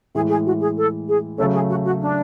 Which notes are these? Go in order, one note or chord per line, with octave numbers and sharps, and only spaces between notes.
A2 E3 G#3 G#4
G#4
F#4
G#4
A4
G#4
C#3 F#3 A3 C#4 A4
G#4
F#4
F#4
D4